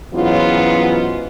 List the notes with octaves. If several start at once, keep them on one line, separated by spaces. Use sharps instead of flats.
G#2 E3 F#3 B3 C#4 F4